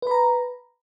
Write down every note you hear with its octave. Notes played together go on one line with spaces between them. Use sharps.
B4 A#5 B5